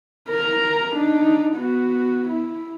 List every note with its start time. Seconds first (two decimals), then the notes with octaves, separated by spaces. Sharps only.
0.30 A#4 A#5
0.96 D4 D#4
1.56 B3 F#4
2.29 E4